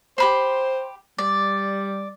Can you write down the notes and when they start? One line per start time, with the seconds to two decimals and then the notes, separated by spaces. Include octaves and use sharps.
0.18 G4 C5 B5 C6
1.18 G3 D5